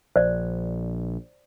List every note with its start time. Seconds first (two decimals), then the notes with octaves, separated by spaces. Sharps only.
0.16 A#1 C5 D5